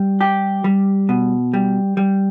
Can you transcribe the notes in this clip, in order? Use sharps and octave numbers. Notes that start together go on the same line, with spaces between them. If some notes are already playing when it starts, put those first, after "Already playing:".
Already playing: G3
G4
G3
B2
G3
G3